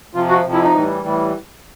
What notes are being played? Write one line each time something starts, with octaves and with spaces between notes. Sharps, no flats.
F2 C3 F3 F4
F#4
F2 C3 F3
E4
D#4
A2 E3 G3
A2 E3 G3